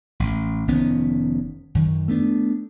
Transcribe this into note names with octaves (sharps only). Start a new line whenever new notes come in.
A1
F1 D#3 B3 C#4
F#2 D#3
A3 B3 D4